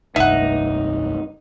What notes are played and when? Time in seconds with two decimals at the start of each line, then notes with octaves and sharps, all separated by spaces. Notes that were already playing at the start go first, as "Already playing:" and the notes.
0.16 F1 C2 G2 D#4 E5 F#5